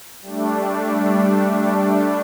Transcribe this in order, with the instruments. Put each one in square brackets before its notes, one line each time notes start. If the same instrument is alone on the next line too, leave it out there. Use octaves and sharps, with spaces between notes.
[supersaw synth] G3 A3 D4